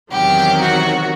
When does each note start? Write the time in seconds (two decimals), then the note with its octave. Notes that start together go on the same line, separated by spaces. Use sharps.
0.12 E2 C3 D#3 F#3 G4
0.61 F#4